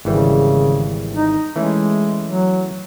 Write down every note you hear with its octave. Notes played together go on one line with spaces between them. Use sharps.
G#1 C#3 E3 G3
D#4
E3 G#3 A3 C#4
F#3